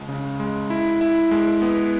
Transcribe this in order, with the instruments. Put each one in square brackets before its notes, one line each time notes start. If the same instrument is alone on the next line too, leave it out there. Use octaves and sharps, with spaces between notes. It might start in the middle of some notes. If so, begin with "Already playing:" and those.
Already playing: [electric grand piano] C#2 G#3
C#3
G#3
E4
E4
G#3
B3